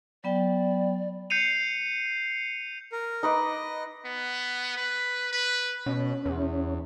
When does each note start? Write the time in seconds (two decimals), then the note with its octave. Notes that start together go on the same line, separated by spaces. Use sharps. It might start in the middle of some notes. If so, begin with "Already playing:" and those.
0.24 F#3 B3 D5 G5
1.30 G6 C7 C#7 D#7 F7
2.92 A#4
3.23 D#4 B4 D#5 D6
4.05 B3
4.77 B4
5.32 B4
5.86 B2 C#4
6.26 E2